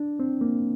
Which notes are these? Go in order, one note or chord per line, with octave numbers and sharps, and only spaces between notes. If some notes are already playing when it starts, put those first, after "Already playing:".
Already playing: D4
C4
A#3